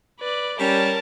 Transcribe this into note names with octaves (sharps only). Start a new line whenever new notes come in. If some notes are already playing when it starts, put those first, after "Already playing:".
B4 D5
G3 C#4 A#4 A5